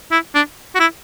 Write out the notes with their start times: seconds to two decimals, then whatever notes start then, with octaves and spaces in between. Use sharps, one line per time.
0.11 E4
0.35 D4
0.75 F#4
0.80 E4